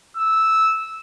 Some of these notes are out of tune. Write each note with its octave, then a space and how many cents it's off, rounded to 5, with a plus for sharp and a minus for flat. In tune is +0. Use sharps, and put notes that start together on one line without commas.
E6 -10